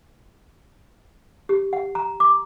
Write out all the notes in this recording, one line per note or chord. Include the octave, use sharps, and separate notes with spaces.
G4
F#5
A#5
D6